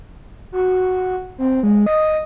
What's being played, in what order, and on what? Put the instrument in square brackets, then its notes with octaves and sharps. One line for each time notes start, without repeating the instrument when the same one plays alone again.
[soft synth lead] F#4
C4
G#3
D#5